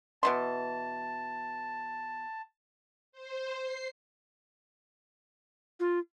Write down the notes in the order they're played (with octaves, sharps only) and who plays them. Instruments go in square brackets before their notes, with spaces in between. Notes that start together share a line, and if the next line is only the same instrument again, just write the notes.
[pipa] B2 E3 C6 [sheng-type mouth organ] A5
[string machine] C5
C7
[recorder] F4